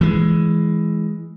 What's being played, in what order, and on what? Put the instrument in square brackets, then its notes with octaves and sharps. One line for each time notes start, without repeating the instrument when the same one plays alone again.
[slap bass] E3 G#3